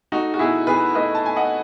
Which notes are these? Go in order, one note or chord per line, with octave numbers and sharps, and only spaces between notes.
A3 D#4 F#4
F#4
B2 E4 G#4
B2 G#4 B4
A3 B4 D#5
A5
A3 G#5
D#5 F#5